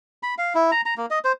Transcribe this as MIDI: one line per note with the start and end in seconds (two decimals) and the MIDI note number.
0.23 0.35 83
0.38 0.53 77
0.55 0.71 64
0.72 0.81 82
0.86 0.94 82
0.98 1.06 58
1.11 1.19 75
1.24 1.32 72